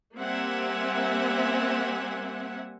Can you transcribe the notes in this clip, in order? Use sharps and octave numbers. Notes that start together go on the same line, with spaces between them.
G3 A#3 C4 E5 F#5 G#5